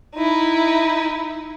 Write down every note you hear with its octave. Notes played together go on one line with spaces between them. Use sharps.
D#4 E4